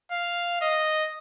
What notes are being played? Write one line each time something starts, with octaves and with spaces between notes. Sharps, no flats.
F5
D#5